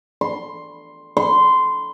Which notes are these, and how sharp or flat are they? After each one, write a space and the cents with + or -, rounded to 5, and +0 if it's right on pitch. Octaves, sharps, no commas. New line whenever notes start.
C6 +5
C6 -15